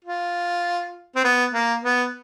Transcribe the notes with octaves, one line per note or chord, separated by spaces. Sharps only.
F4
C4
B3
A#3
B3